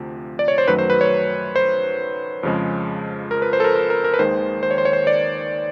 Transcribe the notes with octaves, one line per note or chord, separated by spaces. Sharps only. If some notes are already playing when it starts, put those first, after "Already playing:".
Already playing: D2 C3 F3
D5
C#5
C5
F#2 D#3 F#3 A3 B4
C5
B4
C#5
C5
F2 C#3 F3 G#3
A#4
B4
C5
A4
A#4
A#4
A#4
A#4
B4
D#2 D#3 G#3 C5
C5
C#5
C5
C#5
C5
D5